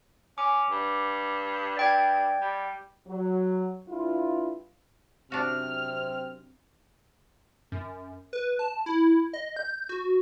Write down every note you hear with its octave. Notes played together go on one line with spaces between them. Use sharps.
C#4 D6
G2
D5 G5 G#6
G3
F#3
G2 E4 F4
F#2 C3 C4 D4 F#4 F6
F#2
B4
A5
E4
D#5
G6
F#4